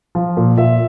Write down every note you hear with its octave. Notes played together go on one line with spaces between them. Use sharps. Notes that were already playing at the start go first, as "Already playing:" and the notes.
F3
A#2
A#2 E5